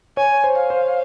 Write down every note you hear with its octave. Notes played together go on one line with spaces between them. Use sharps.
C#5 G#5
C5
F5
C5